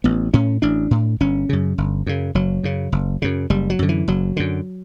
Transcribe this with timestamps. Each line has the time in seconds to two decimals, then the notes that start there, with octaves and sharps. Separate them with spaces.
0.04 A1 B3
0.34 A2 C#4
0.62 A1 D4
0.91 A2
1.20 G1 C#4
1.49 F#2 C#3
1.78 G1
2.06 F#2 C#3
2.35 F#1 F#3
2.63 F#2 C#3
2.92 F#1
3.22 F#2 C#3
3.50 F#1 G3
3.70 F#3
3.79 F#2 D3
3.89 E3
4.08 F#1 F#3
4.37 F#2 D3